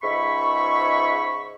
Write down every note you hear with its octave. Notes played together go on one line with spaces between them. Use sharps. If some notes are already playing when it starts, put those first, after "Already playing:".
C#2 G#2 E5 B5 C#6